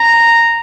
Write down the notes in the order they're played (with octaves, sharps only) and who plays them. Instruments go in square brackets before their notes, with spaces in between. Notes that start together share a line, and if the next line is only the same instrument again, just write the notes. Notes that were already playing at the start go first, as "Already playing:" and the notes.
Already playing: [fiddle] A#5